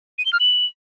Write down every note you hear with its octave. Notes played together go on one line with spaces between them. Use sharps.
D#7
G7
F6
F#7